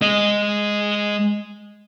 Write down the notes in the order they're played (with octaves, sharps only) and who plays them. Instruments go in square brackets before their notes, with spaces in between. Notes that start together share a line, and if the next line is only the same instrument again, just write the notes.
[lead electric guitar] G#3 D#5